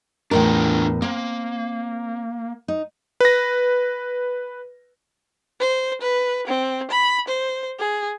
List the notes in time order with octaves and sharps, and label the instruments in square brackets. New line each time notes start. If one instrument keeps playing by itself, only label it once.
[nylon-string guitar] E2 A2 A#4 [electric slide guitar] D4 F4 G5
[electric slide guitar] A#3 [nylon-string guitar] C4
[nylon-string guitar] D#4
[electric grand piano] B4 A#6
[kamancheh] C5
B4
C4
B5
C5
G#4